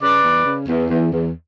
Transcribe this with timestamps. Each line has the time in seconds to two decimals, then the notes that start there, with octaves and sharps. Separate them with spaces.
0.01 C#3 B4 D5
0.24 E2
0.46 C#3
0.68 E2
0.90 E2
1.12 E2